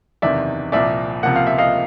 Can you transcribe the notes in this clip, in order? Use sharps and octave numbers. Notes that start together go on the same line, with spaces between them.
F#1 E2 C3 D#3 D5 E5
C2 A#2 F3 D5 E5
C#2 C3 F3 A#3 F#5
F5
E5
D#5 F5